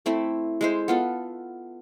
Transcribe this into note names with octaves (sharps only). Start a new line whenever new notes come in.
A3 C4 E4
G#3 E4 C5
B3 F4 A4